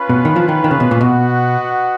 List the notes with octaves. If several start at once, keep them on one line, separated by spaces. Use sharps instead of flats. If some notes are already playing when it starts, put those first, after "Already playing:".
Already playing: C#4 F4 B4
B2
D#3
F3
D#3
D#3
C#3
B2
A#2
B2 F#4 B4 D#5 F#5